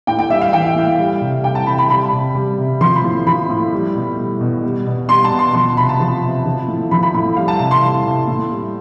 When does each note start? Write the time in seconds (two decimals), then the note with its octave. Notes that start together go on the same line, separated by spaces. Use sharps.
0.07 A2 G5
0.19 G5
0.30 G3 E5
0.41 F5
0.53 E3 G5
0.76 A2
0.99 G3
1.21 C3
1.44 G3 G5
1.55 A5
1.67 C3 B5
1.78 B5
1.90 G3 B5
2.12 C3
2.35 G3
2.58 C3
2.81 F3 C6
2.96 B5
3.03 A2
3.27 F3 B5
3.49 A2
3.73 G3
3.95 B2
4.18 G3
4.41 B2
4.63 G3
4.86 B2
5.09 G3 C6
5.24 A5
5.31 B2
5.39 C6
5.55 F3 C6
5.77 C3 B5
5.89 A5
6.00 F3
6.23 C3
6.46 F3
6.68 A2
6.91 F3 B5
7.03 B5
7.14 A2 B5
7.37 G3 F5
7.48 A5
7.59 C3 A5
7.71 C6
7.83 G3
8.05 C3
8.28 A2
8.50 G3